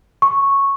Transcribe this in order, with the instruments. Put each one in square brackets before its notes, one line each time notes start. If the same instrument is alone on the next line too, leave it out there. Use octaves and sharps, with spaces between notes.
[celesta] C#6